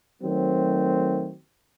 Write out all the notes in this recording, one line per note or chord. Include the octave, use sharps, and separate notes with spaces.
D#3 F#3 A3 C4